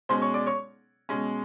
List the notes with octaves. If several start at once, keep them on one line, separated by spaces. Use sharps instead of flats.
B2 G#3 C#4 C5 C6
C#5 C#6
D5 D6
C#5 C#6
B2 G#3 C#4